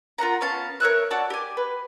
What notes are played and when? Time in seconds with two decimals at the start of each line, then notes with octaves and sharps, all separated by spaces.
0.18 F4 A#4 F#5 A#5
0.40 B3 C#4 F5 A5
0.80 A#4 C#5 E5 F#6
1.10 F#4 D5 A5 E6
1.30 G4 G#5
1.57 B4